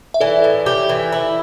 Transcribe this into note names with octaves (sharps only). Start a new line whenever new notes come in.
E5
E3 A4 D5
A2
G4
E3
E4